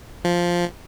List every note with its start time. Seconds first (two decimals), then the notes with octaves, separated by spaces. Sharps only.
0.25 F3